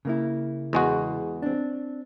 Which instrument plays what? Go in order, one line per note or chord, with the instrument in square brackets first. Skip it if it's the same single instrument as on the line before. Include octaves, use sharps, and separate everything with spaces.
[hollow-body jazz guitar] C#3 A#3 E4
[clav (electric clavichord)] E2 G#3 F#4
[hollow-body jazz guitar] C4 D4